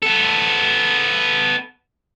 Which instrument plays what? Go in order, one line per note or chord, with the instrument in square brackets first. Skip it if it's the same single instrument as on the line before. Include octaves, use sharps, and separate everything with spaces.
[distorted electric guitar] B3 A4